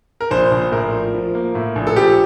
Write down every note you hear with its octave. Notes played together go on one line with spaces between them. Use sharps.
A#4
A#1 C5
A#1
C5
A2 A#4
F3
F3
A#3
A2
A#1
A4
F3 G4